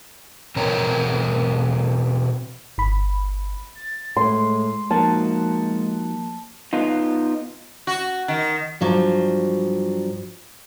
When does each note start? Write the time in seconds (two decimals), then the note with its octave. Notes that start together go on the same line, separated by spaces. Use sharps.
0.56 B2 E3 C4 A#4 C#5 A#5
2.78 G1 B5
3.75 A6
4.17 A2 G#3 C6
4.91 F3 A#3 D#4 F#4 A5
6.73 B3 D#4 F4
7.87 F#4
8.28 D#3
8.81 G2 F3 F#3